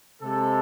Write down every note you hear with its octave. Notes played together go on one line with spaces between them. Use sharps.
C3 G#3 A4